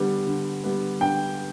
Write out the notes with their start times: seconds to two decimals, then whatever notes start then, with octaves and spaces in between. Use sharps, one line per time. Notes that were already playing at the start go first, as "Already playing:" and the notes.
Already playing: D3 G3 B3
0.27 D3
0.64 G3 B3
1.01 D3 G5